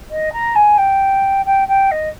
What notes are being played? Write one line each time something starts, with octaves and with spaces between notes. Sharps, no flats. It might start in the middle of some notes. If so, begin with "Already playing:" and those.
D#5
A#5
G#5
G5
G5
G5
D#5